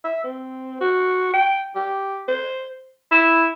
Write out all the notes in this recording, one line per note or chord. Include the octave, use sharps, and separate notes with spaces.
E5
C4
F#4
G5
G4
C5
E4